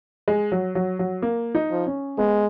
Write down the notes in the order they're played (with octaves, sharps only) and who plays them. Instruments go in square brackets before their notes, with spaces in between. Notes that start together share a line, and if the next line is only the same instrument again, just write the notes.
[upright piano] G#3
F#3
F#3
F#3
A#3
D#4
[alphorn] F3
[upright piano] C#4
[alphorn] G#3 [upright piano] B3